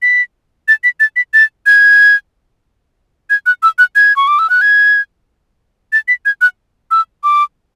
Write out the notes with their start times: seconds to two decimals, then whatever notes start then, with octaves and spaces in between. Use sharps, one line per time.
0.02 B6
0.68 A6
0.84 B6
1.00 A6
1.16 B6
1.34 A6
1.66 G#6
3.30 G#6
3.46 F#6
3.63 E6
3.78 F#6
3.96 G#6
4.16 C#6
4.28 D6
4.39 E6
4.50 F#6
4.61 G#6
5.93 A6
6.08 B6
6.25 G#6
6.41 F#6
6.91 E6
7.24 D6